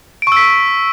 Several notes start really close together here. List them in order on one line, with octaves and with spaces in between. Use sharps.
D7 C#6 E6 B6